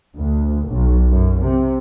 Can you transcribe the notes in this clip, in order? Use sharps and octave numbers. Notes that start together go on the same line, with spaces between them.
D2
B1
F#2
C3